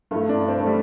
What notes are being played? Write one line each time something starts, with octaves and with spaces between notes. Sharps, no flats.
G2 E3 A3
D4
C4
A3
G3